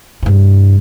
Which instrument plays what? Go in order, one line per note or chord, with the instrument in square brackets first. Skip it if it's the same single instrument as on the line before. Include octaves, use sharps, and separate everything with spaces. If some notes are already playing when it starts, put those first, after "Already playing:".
[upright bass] G2 C3